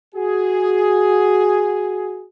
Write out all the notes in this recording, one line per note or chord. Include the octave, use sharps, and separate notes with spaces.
F#4 G#4